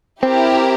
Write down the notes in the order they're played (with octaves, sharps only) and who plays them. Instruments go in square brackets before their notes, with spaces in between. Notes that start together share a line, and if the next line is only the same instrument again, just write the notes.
[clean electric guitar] C4 [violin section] E4 G4 A#4